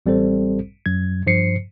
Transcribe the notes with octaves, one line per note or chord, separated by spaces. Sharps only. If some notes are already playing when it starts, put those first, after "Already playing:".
A1 G3 C4 A4 C5
F#2 F#3 G#6
G2 F3 C5 C7 C#7